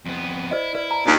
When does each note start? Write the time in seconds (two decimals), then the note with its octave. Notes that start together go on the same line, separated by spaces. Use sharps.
0.06 F2 B3
0.51 E4 C5 D5 D#5
0.75 E4 B4 D5
0.91 A5 A#5
1.06 D#2 D4 F4 D5 G5 A#5